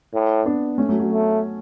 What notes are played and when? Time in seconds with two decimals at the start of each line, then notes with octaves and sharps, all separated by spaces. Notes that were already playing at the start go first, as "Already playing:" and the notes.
0.14 A2
0.46 B3 D4
0.78 A3 C#4
0.89 F#3 A3
1.00 F#3
1.11 A3